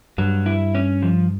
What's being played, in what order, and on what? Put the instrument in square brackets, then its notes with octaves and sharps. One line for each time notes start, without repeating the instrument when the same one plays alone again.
[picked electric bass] G2 [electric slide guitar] F#3
[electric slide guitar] E4
C#4
F3